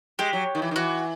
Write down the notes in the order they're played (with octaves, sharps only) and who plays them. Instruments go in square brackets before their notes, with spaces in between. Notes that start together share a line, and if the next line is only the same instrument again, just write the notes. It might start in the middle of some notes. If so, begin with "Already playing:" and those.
[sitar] G#3 [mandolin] G4
[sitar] F#3
D#3
E3
D#3
[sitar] E3 [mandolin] F#4